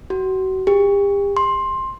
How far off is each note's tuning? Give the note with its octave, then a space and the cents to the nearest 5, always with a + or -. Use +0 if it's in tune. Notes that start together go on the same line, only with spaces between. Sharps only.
F#4 +35
G4 +40
C6 +15